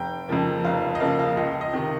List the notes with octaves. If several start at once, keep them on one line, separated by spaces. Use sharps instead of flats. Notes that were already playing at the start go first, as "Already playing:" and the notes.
Already playing: F1 G5
F2 C#3 F3 A#3
F1 F5
F5
D#5
F2 C#3 F3 A#3 F5
F5
C#2 D#5
D#5
C3 D#3